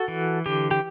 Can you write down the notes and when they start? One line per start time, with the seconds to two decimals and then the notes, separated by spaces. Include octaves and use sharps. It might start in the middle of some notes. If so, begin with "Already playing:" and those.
Already playing: F#4 A4
0.08 E3
0.46 D3 G4
0.71 G4